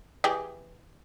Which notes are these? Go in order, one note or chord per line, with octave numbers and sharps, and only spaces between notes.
E3 G4 G#4